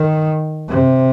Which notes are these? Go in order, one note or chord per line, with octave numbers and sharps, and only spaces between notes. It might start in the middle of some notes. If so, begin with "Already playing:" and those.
Already playing: D#3
C3